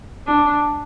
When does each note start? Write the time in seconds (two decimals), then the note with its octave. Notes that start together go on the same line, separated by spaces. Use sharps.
0.27 D4